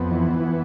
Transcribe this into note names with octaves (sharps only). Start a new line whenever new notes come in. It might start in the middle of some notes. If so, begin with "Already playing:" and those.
Already playing: F2 B3
E3
E3